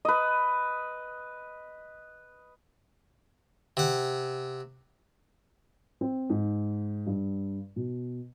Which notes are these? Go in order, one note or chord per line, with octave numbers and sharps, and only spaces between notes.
B4 D#5
C3 F#5
C4
G#2
G2
B2